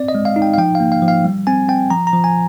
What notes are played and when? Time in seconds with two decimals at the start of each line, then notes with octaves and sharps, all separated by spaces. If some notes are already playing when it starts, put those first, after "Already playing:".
Already playing: C4 D5
0.08 D#5
0.15 G#3
0.25 F5
0.36 D#4
0.42 G5
0.53 F5
0.58 F3 G5
0.75 A#3 F5
0.92 F5
1.02 F3
1.08 F5
1.25 G3
1.47 C4 G#5
1.69 C4 G5
1.90 F3 A#5
2.07 A#5
2.13 F3
2.24 G#5